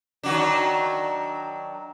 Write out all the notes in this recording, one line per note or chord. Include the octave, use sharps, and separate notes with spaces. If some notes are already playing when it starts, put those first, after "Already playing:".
D#3 F#3 D4